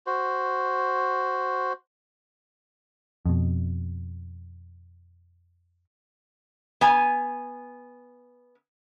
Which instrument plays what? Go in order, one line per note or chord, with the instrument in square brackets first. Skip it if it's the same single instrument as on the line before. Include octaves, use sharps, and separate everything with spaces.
[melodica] F#4 C5
[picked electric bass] F2 B2
[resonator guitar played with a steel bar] B3 G#5